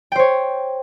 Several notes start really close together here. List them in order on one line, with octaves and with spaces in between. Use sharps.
G5 C5 C#5